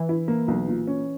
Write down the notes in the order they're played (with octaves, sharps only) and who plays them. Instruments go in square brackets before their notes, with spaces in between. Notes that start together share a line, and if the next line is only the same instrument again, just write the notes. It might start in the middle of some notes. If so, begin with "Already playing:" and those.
Already playing: [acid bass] E3
[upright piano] E4
A#3
B1
A#2
C#4